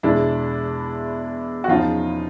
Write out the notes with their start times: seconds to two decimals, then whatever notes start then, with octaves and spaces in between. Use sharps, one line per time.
0.03 E2 B2 G#3 D4 E4
1.64 F#4
1.68 E2 C#3 F3 D#4 F4